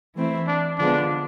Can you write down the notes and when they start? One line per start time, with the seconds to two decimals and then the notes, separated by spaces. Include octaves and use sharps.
0.14 E3 A3 C4 E4
0.47 D4
0.78 D3 F3 G#3 B3 D4